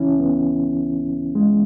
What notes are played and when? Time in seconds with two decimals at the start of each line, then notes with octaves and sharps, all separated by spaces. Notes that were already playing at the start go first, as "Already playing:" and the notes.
Already playing: C#2 C#3 E3 C#4 E4
0.20 B3
1.35 G#3